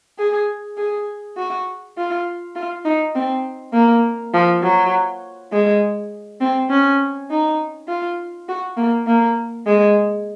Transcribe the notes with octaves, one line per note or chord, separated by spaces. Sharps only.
G#4
G#4
F#4
F4
F4
D#4
C4
A#3
F3
F#3
G#3
C4
C#4
D#4
F4
F#4
A#3
A#3
G#3